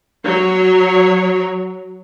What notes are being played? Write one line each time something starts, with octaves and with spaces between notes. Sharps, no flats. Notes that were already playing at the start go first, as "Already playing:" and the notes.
F#3 C#5